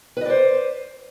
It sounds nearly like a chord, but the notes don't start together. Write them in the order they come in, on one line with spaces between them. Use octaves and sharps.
B4 D#5 D5 C5